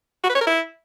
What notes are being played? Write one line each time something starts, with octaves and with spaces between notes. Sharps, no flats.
F#4
B4
C#5
A#4
E4